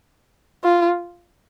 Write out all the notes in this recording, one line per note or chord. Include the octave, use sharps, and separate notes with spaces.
F4